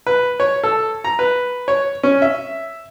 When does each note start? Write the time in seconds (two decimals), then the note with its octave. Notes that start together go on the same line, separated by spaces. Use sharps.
0.07 B4
0.40 C#5
0.64 A4
1.04 A#5
1.19 B4
1.68 C#5
2.03 C#4
2.22 E5